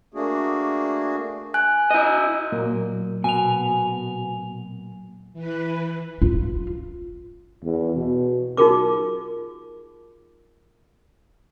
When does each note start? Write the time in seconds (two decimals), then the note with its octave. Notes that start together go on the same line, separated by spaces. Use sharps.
0.14 A3 A#3 D4 F#4 G#4
1.54 G#5 F#6
1.91 E4 D#5
2.52 A#2 F#3 A#3
3.24 B2 G#5 F7
5.33 E3 B4
6.22 F4
7.64 E2
7.96 B2
8.57 D#4 F4 F#4 G#4 A#4 D6